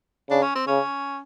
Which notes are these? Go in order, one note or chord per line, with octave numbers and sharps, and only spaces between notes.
C#3 D4
C#4
C4
C#3 C#4